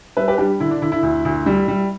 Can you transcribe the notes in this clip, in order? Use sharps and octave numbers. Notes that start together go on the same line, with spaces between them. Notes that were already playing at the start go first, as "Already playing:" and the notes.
G3 B4 E5
G4 B4
G3 D4 G4
D3 E4
D4
D3 E4
E4
D2
D2
G3
G3